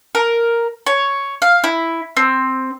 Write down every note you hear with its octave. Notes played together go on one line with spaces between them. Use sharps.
A#4
C#5
F5
E4
C4